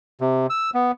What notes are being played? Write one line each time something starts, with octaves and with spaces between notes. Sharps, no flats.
C3
E6
B3